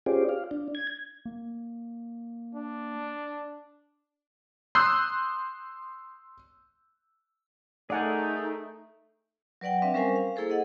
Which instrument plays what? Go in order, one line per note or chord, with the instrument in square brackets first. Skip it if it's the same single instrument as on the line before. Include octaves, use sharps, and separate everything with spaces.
[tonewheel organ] C#4 F4 G4 G#4 C5 D5
F5
D4
G#6
[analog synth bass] A#3
[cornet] D4
[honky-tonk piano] C6 D#6 E6 F#6 G6 C7
[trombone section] A3 [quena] D#4 [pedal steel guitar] G#4 A#4 [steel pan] D5 F#5 G#5
[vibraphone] F#3 B4 D5 F#5 G5
C4 D4 B4 E5 F5
G3 C#4 A#4 C5 F5 G#5
F5
A#3 E4 G#4 A4 C5
A4 D#5 F#5